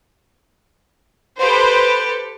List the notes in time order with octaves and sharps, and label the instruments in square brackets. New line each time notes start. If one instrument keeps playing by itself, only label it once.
[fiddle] G4 A4 [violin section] B4 C5